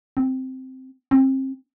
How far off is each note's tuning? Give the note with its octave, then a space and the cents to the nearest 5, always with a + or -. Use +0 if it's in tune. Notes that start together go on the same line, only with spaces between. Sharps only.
C4 -5
C4 +30